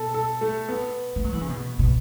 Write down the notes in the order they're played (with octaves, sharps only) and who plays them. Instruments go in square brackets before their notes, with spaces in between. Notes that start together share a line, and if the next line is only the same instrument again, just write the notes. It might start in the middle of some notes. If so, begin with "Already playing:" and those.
Already playing: [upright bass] B2 [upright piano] A4
[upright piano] A4
A3
B3
[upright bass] A3
F#3
E3
C#3
B2
B2